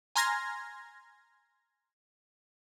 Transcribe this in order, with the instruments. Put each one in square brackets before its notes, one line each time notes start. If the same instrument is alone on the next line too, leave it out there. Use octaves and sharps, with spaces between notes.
[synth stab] G#5 A#5 C6 F6 G#6 A#6